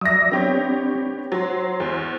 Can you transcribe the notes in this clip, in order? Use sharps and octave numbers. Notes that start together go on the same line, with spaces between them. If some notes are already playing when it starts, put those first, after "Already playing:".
F#3 D5 E5 D#6 A#6
B3 C4 D4 G4 C#5
F#3 C5
E2